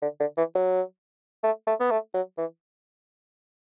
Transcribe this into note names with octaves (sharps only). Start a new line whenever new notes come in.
D3
D3
E3
F#3
A3
A3
B3
A3
F#3
E3